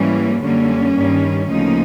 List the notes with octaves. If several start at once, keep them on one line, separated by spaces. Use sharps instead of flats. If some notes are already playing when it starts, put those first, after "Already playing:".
Already playing: G#2 E3 G3 A#3 C#4
F#2 D3 G3 A#3 C#4
G2 D#3 G3
D2 C#3 F3 A#3 D#4